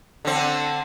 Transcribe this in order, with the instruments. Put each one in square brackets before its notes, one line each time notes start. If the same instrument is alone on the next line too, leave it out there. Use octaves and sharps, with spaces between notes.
[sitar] D3 C4